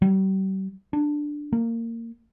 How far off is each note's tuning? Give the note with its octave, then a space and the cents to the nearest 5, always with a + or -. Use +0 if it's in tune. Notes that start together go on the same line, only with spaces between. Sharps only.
G3 -40
D4 +5
A#3 -20